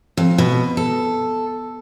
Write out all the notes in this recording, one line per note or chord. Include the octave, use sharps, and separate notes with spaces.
F2
B2
A4